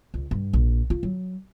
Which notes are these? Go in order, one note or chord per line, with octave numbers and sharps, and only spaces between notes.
C#2
G2
A#1
F4
F#3